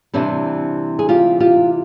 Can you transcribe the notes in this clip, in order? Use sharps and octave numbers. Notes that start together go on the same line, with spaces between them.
C3 E3 G3 C4 D4
G#4
F4 G4
F4 G4